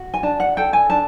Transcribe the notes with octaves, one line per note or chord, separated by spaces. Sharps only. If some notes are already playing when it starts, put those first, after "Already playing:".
Already playing: F#4
G#5
D4 A5
F#5
A4 G5
G#5
D4 A5